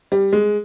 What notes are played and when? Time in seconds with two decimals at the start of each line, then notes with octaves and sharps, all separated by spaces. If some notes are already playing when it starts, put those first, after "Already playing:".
0.12 G3
0.33 G#3